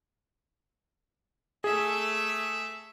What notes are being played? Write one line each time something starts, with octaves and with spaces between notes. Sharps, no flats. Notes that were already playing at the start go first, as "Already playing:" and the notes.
A3 G#4 E5